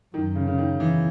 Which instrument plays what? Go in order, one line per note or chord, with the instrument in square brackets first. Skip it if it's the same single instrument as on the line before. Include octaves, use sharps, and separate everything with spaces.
[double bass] F#2 [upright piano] D#3
[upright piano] C#3
C#3
D#3
[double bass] E2 [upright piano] E3